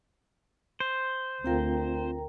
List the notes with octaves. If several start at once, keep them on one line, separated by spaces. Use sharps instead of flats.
C5
D2 C4 F4 A#4 G5 A#5